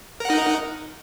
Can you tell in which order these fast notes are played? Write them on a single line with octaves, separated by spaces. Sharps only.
A#4 F#5 D#4